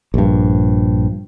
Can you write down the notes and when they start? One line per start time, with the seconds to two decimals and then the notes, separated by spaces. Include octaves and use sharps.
0.14 A#1 G2